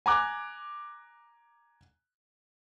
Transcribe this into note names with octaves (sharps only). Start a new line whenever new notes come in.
G#5 A#5 D6 F#6